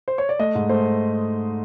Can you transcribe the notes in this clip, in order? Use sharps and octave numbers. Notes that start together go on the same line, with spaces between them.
C5
C#5
D5
A3 D#5
G#2
A3 C5